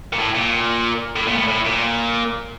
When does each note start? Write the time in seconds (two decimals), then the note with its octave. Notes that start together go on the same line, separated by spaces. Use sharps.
0.13 A#2
0.19 A2
0.35 A#2
1.16 A2
1.27 A#2
1.38 A2
1.48 A2
1.65 A#2